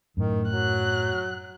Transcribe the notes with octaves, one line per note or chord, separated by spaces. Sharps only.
F#2 A2 D#3
F#3 F#6